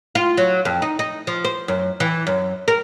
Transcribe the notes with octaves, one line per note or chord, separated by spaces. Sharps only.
F4
F#3
F2
D#4
D#4
F3
C5
F#2
E3
F#2
A#4